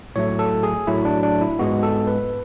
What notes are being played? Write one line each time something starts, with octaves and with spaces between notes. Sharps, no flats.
A2 F#3 A3 C#5
A4
G#4
A2 F#3 A3 E4
D4
D4
E4
G#2 G#3 B3 F#4
A4
B4